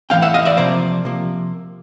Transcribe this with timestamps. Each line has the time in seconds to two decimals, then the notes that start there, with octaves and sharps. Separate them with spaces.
0.10 A2 E3 A3 C#4 F5 G5
0.22 E5 F#5
0.34 D#5 F5
0.45 D5 E5
0.57 C3 F3 A#3 C5 D5
1.05 C3 F3 A#3